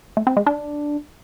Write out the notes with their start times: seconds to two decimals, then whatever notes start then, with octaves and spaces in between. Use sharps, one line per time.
0.17 A3
0.27 C4
0.37 G#3
0.46 D4